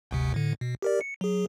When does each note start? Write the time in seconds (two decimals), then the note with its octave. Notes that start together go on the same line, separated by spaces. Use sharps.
0.11 G1 D2 C3
0.34 A2 D3
0.61 B2
0.82 G4 A#4 D5
1.01 C#7
1.21 F#3 G#4